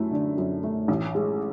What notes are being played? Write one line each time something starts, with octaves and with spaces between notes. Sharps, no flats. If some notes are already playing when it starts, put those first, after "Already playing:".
Already playing: F#2 A3 E4
D3
F#2
A3
A1
G#3